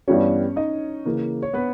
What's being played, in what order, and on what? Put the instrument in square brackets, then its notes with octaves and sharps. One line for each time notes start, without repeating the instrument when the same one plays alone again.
[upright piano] G2 E3 G3 B3 G4 [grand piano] C#4 C#5
[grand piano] D#4 D#5
[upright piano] C#3 E3 A#3
[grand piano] C#5
B3 B4